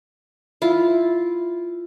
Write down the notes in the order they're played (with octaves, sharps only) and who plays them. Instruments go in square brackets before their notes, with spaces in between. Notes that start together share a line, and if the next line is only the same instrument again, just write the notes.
[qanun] E4 F4